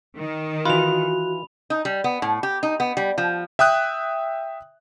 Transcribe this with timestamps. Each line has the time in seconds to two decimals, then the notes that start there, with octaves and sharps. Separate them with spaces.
0.18 D#3
0.65 E3 F4 F#4 B5 F7
1.70 D#4
1.85 G3
2.04 B3
2.22 A2
2.43 G4
2.63 D#4
2.80 B3
2.97 G3
3.18 F3
3.59 E5 G5 D#6 F#6